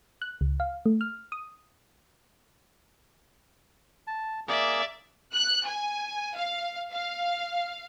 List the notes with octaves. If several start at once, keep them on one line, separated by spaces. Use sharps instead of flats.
F#6
C#2
F5
A3
F6
D#6
A5
A#3 G#4 D5 E5
F#6
G#5
F5
F5